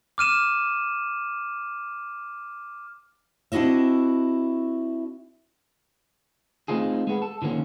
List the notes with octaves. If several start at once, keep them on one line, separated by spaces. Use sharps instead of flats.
D6 F6 D#7 E7
C4 D4 E4 F#4 D#5 E5
A3 C4 D#4 F4 G#4
G#3 B3
A4
D3 D#3 F3 A#3 C#4